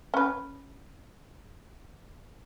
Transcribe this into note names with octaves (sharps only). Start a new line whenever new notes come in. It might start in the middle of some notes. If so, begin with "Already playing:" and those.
C#4 B4